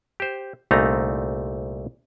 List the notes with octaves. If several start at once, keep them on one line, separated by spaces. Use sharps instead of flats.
G4 C5
C2 A#2 A3 C4 D#4 A#5